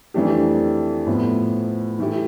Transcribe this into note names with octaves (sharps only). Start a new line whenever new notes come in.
F2 E3 A3 D4 G4
A2 F3 B3
E3 A3 E4 G4